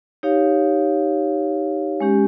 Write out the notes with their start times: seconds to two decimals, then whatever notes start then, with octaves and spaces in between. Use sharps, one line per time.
0.23 D#4 G4 C#5 F5
2.00 G#3 C#4 G4